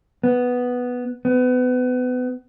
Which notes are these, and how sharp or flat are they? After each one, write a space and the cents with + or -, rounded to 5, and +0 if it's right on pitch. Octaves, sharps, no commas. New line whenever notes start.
B3 +0
B3 +30